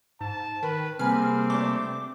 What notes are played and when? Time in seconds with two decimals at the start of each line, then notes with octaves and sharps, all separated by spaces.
0.21 G#2 A5
0.63 D#3 B4
0.99 C3 G3 A#3 C4 G#4 B4 F6
1.50 A3 D4 D6